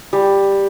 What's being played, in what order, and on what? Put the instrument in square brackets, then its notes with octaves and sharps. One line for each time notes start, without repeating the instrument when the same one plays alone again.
[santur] G3